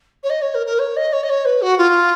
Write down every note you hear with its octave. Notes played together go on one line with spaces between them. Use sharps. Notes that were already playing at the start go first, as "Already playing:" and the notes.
C#5
D#5
C#5
A#4
A#4
C#5
D#5
C#5
D#5
C#5
B4
F#4
F4